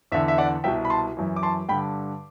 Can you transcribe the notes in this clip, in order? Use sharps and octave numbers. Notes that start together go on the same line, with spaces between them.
E2 D3 E5
E5
D5 F#5
C2 B2 E5 G5
B5
A5 C6
F#2 E3
D6
A5 C6
G2 D3 G5 B5